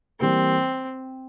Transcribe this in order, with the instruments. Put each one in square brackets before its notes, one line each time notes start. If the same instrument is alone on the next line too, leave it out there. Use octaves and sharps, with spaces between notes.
[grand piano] E3 G3 A#3 [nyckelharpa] C4